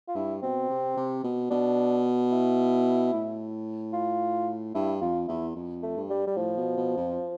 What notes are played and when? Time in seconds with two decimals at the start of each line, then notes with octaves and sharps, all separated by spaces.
0.08 F4
0.15 G2 E4
0.42 B2 C4
0.69 C3
0.97 C3
1.23 B2
1.50 B2 D4
2.32 E4
3.13 A2
3.93 F4
4.75 G2 E4
5.01 F2 F4
5.28 E2 E4
5.55 F2
5.83 A3
5.97 G2
6.10 G3
6.27 G3
6.36 A2 F3
6.57 B2
6.77 B2
6.97 F2